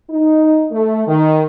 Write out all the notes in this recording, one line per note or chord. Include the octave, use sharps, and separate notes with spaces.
D#4
A3
D#3